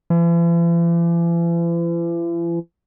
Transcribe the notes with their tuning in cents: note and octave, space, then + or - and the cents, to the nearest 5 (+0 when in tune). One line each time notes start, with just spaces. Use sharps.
E3 +45